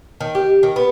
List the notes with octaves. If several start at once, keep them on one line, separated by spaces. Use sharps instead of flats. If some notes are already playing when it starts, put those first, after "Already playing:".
D#3
G4
D#3
B3